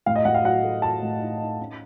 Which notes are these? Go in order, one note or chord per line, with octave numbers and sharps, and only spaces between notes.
A2 F5
D#5
A2 F#5
F5
F#3 F#5
A3
F#3 A5
A2
D#4
D#4
C#4